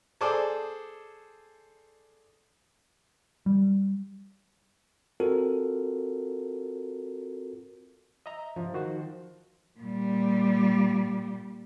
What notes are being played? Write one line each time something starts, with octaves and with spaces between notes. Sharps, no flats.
G#4 A4 C5 D5 D6
G3
C4 F4 F#4 A4 A#4
D#5 E5 A#5
F3
D#3 F#4 C5
A#2 G3